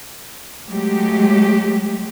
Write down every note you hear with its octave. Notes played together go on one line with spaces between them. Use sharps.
F#3 G#3 A3 G4